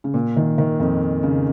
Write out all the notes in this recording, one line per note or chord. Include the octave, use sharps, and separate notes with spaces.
C#3
A#2
D#3
D#3
F2
C#3